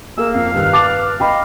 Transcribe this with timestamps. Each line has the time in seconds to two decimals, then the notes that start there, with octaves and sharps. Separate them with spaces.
0.18 A#3 G#4 E6
0.34 F2 F5
0.54 G2 D#3 B4 F6
0.73 A5 D6 A6 F7
1.20 D#5 F5 G5 B5